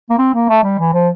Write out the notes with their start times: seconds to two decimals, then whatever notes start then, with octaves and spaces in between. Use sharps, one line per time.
0.10 A#3
0.19 C4
0.34 A#3
0.49 A3
0.63 G3
0.79 E3
0.93 F3